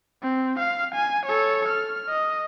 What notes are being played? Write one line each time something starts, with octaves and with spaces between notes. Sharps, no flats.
C4
F5
G#5
A4 C#5
F6
D#5